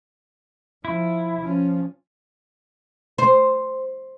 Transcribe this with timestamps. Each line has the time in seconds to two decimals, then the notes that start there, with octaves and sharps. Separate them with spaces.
0.85 F3 E4
1.40 F3 C#4
3.18 C5